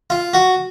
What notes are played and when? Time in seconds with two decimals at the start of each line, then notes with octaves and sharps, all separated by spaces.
0.10 F4
0.33 F#4